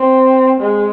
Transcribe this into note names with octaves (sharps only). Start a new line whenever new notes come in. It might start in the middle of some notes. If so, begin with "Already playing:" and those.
Already playing: C4
G#3